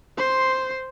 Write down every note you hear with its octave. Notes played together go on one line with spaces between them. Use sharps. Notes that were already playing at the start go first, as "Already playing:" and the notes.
C5 C6